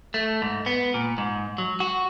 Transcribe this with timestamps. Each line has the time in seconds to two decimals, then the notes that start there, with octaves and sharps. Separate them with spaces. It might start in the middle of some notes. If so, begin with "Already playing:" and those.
0.14 A3
0.42 G#2
0.66 B3
0.94 A#2
1.18 G#2
1.58 F#3
1.80 F#4